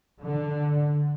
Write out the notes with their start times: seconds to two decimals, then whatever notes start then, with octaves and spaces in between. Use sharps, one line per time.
0.23 D3